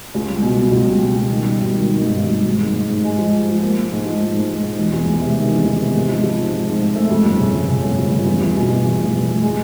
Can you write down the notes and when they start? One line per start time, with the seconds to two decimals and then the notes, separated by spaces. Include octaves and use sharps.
0.14 C#2
0.29 G3
0.42 B2
0.57 B2
0.71 C#2
0.86 G3
1.00 G3
1.16 B2
1.30 D#3
1.45 G3
1.59 G#1
1.73 D#3
1.87 D#3
2.02 G2
2.17 G#1
2.31 G2
2.46 G#2
2.61 G#2
2.75 G#2
2.90 G#2
3.04 G#3
3.18 F3
3.33 G#3
3.48 F3
3.62 A#3
3.76 A#3
3.91 G#2
4.06 F3
4.21 G#2
4.35 G#2
4.49 F3
4.63 G#2
4.78 E1
4.93 E2
5.07 E1
5.21 C3
5.36 D#3
5.51 E2
5.65 E2
5.79 C3
5.95 G#2
6.09 F3
6.24 F3
6.38 G#2
6.52 G#2
6.67 G#2
6.81 G#2
6.96 A3
7.10 F2
7.25 G1
7.39 C#3
7.54 G1
7.69 C#3
7.83 G1
7.97 F2
8.11 G1
8.26 E2
8.41 E2
8.56 B2
8.70 B2
8.85 E2
8.99 F1
9.14 F1
9.29 F1
9.42 G#3